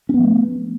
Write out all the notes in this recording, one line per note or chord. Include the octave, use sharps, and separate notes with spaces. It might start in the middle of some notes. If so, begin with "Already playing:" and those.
F3 A3 B3 C#4